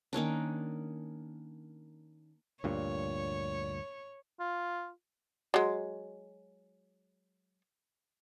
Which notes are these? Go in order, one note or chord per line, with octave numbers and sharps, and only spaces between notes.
D#3 A#3 C#4 D4
D2 G2 A#2 C#5
F4
F#3 G#3